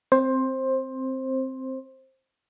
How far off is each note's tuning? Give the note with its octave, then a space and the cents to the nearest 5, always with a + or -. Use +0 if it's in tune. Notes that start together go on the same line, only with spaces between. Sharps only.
C4 +0 C5 +15